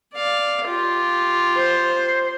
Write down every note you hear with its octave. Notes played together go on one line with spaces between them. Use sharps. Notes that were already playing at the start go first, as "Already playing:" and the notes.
D5 F5
F4 G4
C5